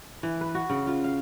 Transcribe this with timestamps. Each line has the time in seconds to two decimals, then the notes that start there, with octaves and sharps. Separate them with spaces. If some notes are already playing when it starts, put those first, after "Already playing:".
0.23 E3
0.41 B4
0.55 F#4
0.69 C#3
0.87 F4
1.04 F5